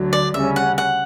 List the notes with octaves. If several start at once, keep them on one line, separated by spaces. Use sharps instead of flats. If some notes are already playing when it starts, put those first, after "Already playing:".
Already playing: D2 D3 F#3
D5
D2 C#3 G3 C#4 E5
F#5
F#5